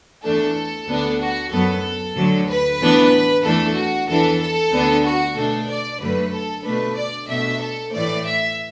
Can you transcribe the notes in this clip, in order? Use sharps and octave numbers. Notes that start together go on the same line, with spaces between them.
E2 E3 A3 D4 A4
D2 D3 B3 D4
F#4
F#2 F#3 B3 A4
D2 D3 F#3
B4
A2 E3 B3 D4
E2 E3 A3 D4 A4
F#4
E2 E3 D4 A4
A4
D2 D3 B3 D4
F#4
B2 A3 D4 A4
D5
F#2 D3 F#3 A3 B4
A4
B2 A3 D4 B4
D5
B2 A3 D4 E5
A4
A2 E3 A3 D5
E5